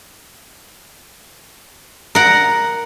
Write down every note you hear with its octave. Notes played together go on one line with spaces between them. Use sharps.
A#4 F#5